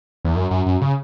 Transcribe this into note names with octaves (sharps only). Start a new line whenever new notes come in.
E2
F#2
F#2
F#2
C#3